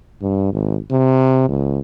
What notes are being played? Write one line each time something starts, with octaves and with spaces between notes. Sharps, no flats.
G2
G#1
C3
C#2